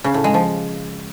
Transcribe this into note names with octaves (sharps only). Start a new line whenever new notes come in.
C#3
A2
G#3
F3